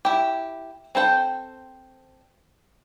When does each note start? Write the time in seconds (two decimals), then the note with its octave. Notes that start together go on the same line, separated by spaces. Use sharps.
0.05 E4 G4
0.95 C4 A4 C5 G5